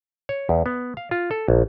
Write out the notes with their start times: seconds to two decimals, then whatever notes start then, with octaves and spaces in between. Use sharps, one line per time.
0.29 C#5
0.49 E2
0.66 B3
0.97 F5
1.11 F4
1.31 A4
1.48 A#1